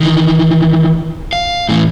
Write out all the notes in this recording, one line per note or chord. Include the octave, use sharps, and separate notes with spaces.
D#3 E3
F5
A2 E3